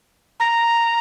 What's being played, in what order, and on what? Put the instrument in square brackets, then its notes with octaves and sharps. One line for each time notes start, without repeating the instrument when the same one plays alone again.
[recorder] A#5